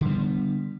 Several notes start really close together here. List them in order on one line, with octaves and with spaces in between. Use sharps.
D3 G3 B3